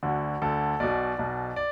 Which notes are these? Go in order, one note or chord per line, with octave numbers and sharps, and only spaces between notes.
D2 D3 F#4
D2 D3 A4
B1 B2 D5
B1 B2
D5